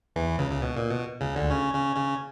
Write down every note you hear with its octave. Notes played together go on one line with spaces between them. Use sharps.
E2 E3
C#2 C#3
C#3
B2
A#2
B2
C#2 C#3
D2 D3
C#3 C#4
C#3 C#4
C#3 C#4